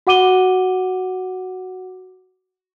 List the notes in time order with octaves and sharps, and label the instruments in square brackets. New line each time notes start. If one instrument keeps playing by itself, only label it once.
[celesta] F#4 F#5 D6 D#7 G7